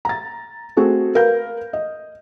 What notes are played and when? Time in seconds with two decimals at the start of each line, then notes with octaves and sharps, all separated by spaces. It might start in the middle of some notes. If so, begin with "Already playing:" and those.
0.05 A#5 A6
0.77 A3 C4 F#4 G#4 A4
1.15 A#4 B4 F5 G6
1.73 D#5